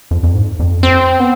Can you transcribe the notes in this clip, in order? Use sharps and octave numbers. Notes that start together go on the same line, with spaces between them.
F2
F2
G#2
F2
C4
B3